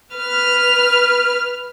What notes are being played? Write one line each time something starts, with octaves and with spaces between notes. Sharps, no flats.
B4 F6